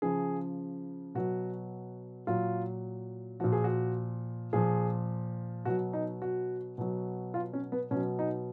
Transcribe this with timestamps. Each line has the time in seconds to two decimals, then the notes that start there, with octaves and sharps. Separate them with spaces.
0.02 C#3 F3 G#4
1.15 B2 F#3 F#4
2.27 A#2 F#3 F4
3.40 A#2 F3 F#4
3.52 G#4
3.64 F#4
4.53 A#2 F3 G#4
5.65 B2 F#3 F#4
5.93 D#4
6.22 F#4
6.78 B2 F#3
7.34 F4
7.53 C#4
7.72 B3
7.91 B2 C#4
7.95 F#3
8.19 D#4